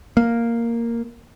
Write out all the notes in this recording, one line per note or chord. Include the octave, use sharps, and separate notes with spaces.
A#3